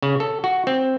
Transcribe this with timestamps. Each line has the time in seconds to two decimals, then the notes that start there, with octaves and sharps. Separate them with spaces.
0.02 C#3
0.20 A4
0.44 F#4
0.67 C4